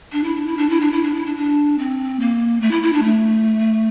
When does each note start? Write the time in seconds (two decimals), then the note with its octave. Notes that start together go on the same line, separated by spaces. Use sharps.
0.12 D4
0.24 E4
0.36 D4
0.47 E4
0.57 D4
0.69 E4
0.80 D4
0.92 E4
1.03 D4
1.14 E4
1.26 D4
1.37 D4
1.79 C4
2.20 A#3
2.61 A3
2.71 E4
2.83 E4
2.93 D4
3.03 A3